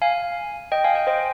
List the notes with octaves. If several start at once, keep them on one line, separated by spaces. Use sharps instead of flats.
F5 G#5
D#5 G5
F5 G#5
D#5 G5
C5 D#5